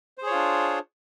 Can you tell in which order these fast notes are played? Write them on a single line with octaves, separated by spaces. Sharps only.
C5 G#4 C#5 F4 D4